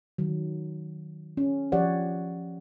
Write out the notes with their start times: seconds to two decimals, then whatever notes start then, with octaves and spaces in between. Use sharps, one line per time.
0.18 D#3 F#3
1.37 C#4
1.72 F3 G4 C#5 D5 F#5